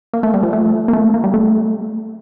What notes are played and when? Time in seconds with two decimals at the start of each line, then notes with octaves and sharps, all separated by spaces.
0.13 A#3
0.23 A3
0.34 G3
0.43 F3
0.53 A3
0.88 A#3
0.93 A3
1.14 A#3
1.24 G3
1.34 A3